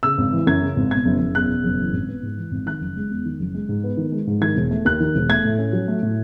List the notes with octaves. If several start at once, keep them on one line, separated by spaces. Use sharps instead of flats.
C#3 E6
G#1
E3
F#2 G#6
C#3
G#1
B2 G#6
F#1
F#1
E2 F#6
B2
F#1
E3
G#1
B3
G#2
E3
G#1
D#3 F#6
F#1
G#3
E2
D#3
F#1
G#3
G#2
B3
D#3
G#3
G#2
D#3 G#6
E1
A3
D#2 F#6
D#3
E1
A3 G#6
A2
C#4
F#3
A3
A2